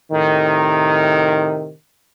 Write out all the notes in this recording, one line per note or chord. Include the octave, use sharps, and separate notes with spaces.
A2 C3 D#3